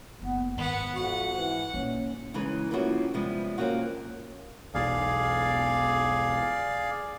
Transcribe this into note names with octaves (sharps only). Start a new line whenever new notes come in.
F#1 B3
G#2 D#3 B3 F#5
F2 F#4 F#5
E3
A#2 A#3 C#4 D#4
C#3 E3 G#3 D#4 B4
F3 A#3 C4 C#4 E4 F#4
C3 F3 G3 G#3 B3
A#3 C4 C#4 F4 F#4
E1 B1 G#4 D5 F5